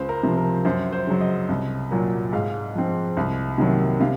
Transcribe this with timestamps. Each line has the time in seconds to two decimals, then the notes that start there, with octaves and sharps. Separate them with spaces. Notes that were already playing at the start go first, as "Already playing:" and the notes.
Already playing: C#2 C5
0.09 A#4
0.23 C3 F3
0.37 A#4
0.65 F#2 C5
0.93 C5
1.07 C#3 F#3
1.21 D#5
1.49 C2
1.91 A#2 F#3 A#3
2.33 G#2 F5
2.75 F3 C4
3.17 C2
3.58 C3 D#3 F#3 A#3
4.00 C3 F5